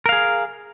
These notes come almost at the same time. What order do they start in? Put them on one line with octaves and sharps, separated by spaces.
A#4 F5 G#4